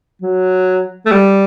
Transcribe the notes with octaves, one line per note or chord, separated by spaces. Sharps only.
F#3
A3
G3